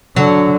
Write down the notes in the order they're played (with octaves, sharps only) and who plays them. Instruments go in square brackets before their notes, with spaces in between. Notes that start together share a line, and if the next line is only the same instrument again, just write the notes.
[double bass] D3 [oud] F#3